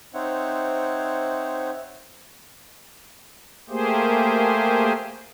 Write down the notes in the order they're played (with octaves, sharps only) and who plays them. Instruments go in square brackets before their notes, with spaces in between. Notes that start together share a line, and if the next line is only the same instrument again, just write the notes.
[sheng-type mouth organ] C4 D#4 C5 C#5 E5 F#5
[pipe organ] A3 A#3 G4 G#4 C5